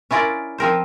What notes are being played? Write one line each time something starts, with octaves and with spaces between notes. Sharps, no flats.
C#4 E4 F4 A#4 D5
F3 C4 A#4 C5